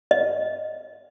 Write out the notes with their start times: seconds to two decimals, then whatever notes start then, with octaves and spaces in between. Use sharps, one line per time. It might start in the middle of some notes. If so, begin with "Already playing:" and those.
0.11 D#5